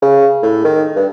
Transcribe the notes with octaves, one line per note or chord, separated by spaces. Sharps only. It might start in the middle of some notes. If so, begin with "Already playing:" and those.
C#3
A2
D#3
G2